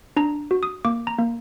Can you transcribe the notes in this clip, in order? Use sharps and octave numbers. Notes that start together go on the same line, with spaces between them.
D4 A#5
F#4
D#6
A#3 D6
A#5
A#3